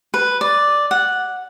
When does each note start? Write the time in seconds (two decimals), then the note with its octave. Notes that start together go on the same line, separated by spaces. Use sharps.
0.14 B4
0.41 D5
0.91 F#5